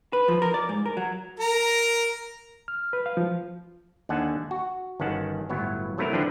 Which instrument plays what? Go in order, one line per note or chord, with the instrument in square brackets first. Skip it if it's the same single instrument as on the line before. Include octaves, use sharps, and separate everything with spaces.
[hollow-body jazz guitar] B4
F3
A#4
D5
G#2
A#4
F#3
[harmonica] A#4 A#5
[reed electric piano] F6
B4
F5
F3
[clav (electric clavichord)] D#2 D3 F#5 G#5 A5
F#4
G1 D#3 C#4 F#5 A5
G1 A2 F#3 B3 E4 C#5
C3 F#3 A3 B3 E4 A#4
D3 F3 D4 B4 G5